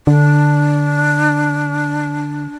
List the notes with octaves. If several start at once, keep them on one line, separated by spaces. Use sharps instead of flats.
D3 D4